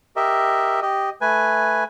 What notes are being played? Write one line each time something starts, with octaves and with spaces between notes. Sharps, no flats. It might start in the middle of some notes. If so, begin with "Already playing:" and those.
G4 A#4 D#5 E5
G4 D#5
A3 B4 G#5